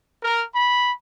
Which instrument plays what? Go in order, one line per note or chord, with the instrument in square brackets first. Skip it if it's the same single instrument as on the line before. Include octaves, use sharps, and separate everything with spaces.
[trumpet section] A#4
B5